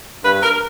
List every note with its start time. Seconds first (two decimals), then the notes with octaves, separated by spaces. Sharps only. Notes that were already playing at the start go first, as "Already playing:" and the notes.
0.24 G2 B4
0.43 A#4